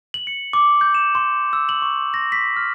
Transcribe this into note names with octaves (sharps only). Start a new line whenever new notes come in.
F#7
C#7
D6
G6
E7
C6
E6
F#7
C#6
A#6
B6
F6